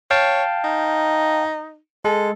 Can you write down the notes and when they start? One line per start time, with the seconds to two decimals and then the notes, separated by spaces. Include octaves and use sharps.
0.11 C#5 F5 G5 A5
0.64 D#4
2.05 G#3 A4